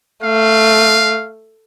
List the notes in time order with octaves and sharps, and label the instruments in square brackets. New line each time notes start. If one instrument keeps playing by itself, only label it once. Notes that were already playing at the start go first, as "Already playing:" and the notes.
[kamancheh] A3 [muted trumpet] F5